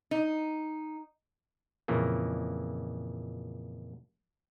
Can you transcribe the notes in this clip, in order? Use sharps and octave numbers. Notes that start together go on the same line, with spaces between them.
D#4
F2 A#2 C#3 E3 A#3